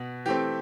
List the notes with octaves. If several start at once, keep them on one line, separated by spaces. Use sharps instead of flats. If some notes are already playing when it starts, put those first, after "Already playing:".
Already playing: B2 B3
E3 A3 C4 G4